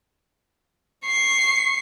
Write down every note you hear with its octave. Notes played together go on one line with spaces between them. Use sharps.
C#6 C7